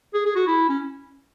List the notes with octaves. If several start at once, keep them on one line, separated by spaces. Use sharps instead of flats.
G#4
G#4
F#4
E4
C#4